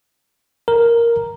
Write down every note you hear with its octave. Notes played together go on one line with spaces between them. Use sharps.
A#4